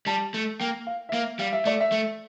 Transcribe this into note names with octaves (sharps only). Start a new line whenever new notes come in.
G3 A5
A3
A#3 G5
F5
E5
A#3 F5
G3 F5
E5
A3 D5
E5
A3